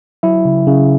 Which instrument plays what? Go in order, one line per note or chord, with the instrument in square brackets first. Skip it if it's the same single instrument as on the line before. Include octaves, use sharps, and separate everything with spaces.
[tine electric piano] F#3 E4 E5
C#3
C#3